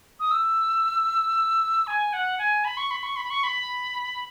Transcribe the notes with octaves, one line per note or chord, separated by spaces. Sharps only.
D#6
E6
G#5
F#5
G#5
B5
C#6
B5
C#6
B5
C#6
B5